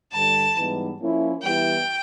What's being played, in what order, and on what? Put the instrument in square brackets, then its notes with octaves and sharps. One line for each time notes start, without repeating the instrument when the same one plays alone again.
[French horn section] G2 D3 G3 [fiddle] A5
[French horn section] G#2 E3 G3 B3 D#4
F3 A#3 C#4 E4
[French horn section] E3 G3 B3 E4 G4 [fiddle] G5